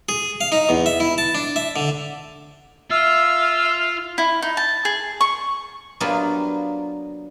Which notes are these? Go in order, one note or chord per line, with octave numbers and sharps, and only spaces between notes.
G#4
F5
D#4
E2
E5
E4
A5
D4
E5
D3
F4 E5 E6 F6
E4
D#4
A5
G#4
C#6
F#3 A#3 B3 D4 F4 G4